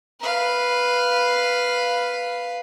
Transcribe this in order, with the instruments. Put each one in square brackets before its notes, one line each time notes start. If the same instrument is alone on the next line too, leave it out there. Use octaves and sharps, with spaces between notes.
[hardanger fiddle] B4 F5